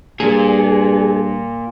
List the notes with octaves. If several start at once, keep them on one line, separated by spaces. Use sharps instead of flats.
G2 A#2 G#4